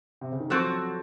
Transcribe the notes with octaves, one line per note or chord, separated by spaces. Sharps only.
C3
C#3
D#3
F3 F#3 C4 F#4 A4